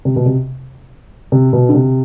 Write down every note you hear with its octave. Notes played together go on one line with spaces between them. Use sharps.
C3
B2
C3
C3
B2
D3
C3